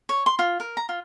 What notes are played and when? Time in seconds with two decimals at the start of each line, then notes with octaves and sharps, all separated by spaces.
0.09 C#5
0.26 C6
0.39 F4
0.60 A#4
0.77 A#5
0.89 F4